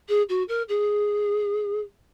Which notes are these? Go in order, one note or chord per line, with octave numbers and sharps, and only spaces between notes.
G#4
F#4
A#4
G#4